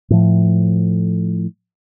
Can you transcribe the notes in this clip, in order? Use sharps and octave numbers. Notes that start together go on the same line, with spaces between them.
A2 F3